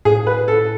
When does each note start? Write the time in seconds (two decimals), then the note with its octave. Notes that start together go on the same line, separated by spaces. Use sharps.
0.05 A2 G#4
0.27 B4
0.48 A4